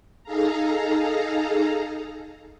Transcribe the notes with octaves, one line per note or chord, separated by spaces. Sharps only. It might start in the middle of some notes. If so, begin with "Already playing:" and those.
D#4 G#4 A4 F5 A#5